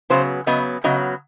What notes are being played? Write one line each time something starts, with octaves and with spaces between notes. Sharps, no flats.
C#3 F#3 B3 C5
C#3 F#3 B3 D#5
C#3 F#3 B3 D#5